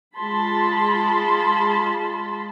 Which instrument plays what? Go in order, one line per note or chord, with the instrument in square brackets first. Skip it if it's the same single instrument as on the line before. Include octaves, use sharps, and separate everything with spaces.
[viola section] G#3 F4 A5 B5 C6